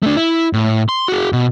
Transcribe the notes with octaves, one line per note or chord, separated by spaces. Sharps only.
A3 D4
E4
A2
C6
F#4 G#4
B2